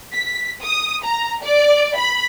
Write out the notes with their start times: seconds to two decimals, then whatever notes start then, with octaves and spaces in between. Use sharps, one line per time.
0.14 B6
0.62 D#6
1.04 A#5
1.44 D5
1.97 B5